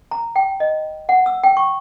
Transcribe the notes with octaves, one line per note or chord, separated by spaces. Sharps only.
A#5
G5
D#5
F#5
E6
G5
C#6